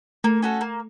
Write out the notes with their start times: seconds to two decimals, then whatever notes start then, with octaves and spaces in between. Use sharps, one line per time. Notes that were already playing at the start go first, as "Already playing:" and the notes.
0.24 A3 A#3
0.42 C#4 F#4 A4
0.61 A#3